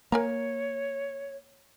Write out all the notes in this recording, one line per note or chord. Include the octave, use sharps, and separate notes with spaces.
A#3 A#4 C#5 G#5 A#5